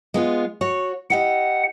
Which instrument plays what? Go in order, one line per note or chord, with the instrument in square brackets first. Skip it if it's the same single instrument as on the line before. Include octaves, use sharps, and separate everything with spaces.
[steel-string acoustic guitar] G#3 B3 F4
F#4 C#5
[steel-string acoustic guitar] E4 G4 D#5 [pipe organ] F#5